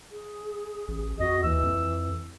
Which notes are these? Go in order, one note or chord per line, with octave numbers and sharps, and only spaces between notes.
G#4
A1
F2 F#4 D#5
D#2 E3 E6
F2